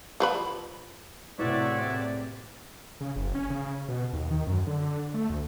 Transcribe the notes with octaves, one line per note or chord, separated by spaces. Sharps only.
F3 B4 B5
E2 A2 C3 E4 F#4 C#5 D5 E5
C#3
F#1
C#4
C#3
B2
D#2
D#3
F#2
D3
A3
D2